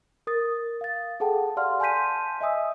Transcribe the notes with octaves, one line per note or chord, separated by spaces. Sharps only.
A#4 D#6 A6
F5 A6
G#4 A4 F#5 G5 A5
G4 D5 F5 F#5 C6 F6
G#5 A5 C6 G6 B6 D#7
D#5 E5 G#5 D#6 E6